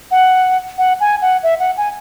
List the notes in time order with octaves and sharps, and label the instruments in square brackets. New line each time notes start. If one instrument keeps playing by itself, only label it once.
[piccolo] F#5
F#5
G#5
F#5
E5
F#5
G#5